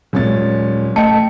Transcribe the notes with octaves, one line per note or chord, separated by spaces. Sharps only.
D#1 F#3 G#3 C#4 A6
A3 D#5 G5 A5 C#7